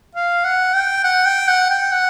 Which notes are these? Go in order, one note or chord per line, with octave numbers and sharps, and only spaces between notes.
F5
F#5
G5
F#5
G5
F#5
G5
F#5